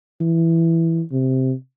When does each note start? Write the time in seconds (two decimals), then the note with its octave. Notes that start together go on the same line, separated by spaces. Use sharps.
0.20 E3
1.12 C3